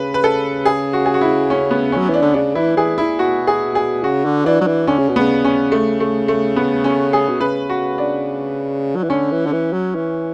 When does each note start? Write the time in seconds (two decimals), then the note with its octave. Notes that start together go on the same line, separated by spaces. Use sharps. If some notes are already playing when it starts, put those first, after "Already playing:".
Already playing: C#3 B4
0.14 B4
0.24 A4
0.65 G#4
0.93 F#4
1.06 G#4
1.14 F#4
1.21 E4
1.50 C#4
1.71 B3
1.92 C#4
1.97 F#3
2.09 E3 D4
2.22 D3
2.34 C#3 D4
2.55 E3 E4
2.76 E3 G#4
2.98 E4
3.19 B2 F#4
3.47 G#4
3.75 G#4
4.03 C#3 F#4
4.25 D3
4.45 E3 D4
4.61 F#3
4.67 E3
4.87 D3 C#4
4.98 C#3
5.09 B2
5.16 C#3 B3
5.45 C#4
5.72 A3
6.00 A3
6.28 A3
6.56 B3
6.84 C#4
7.13 G#4
7.29 B2
7.41 C#3 B4
7.69 F#4
7.98 D4
8.96 F#3
9.03 E3
9.09 D3 C#4
9.31 E3
9.46 D3
9.53 E3
9.73 F#3
9.95 E3